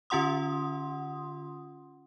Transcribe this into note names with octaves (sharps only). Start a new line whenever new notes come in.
D3 C#4 F4 F#5 C6 D#6